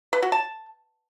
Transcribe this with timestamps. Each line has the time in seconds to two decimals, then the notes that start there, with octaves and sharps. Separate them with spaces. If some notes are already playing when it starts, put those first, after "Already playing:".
0.13 B4
0.22 F#4
0.32 A5